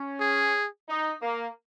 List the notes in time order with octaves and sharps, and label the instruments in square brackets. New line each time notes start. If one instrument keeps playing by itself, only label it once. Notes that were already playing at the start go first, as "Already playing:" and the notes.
Already playing: [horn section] C#4
[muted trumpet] G#4
[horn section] D#4
A#3